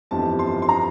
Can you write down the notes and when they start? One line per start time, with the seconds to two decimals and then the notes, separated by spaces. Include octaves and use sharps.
0.11 G1 F2 E3 G3 A5
0.39 C6
0.62 C6
0.69 A#5